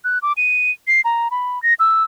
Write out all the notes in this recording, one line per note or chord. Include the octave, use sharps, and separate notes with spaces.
F#6
D6
D#7
C7
A#5
B5
A#6
E6